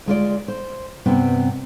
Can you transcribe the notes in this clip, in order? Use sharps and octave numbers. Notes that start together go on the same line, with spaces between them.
D2 G#3 F4 D5
C5
G2 C3 B3 C4